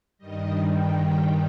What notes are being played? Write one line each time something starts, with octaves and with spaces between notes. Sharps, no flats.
G2 D#3 G3 D#5
G5
G5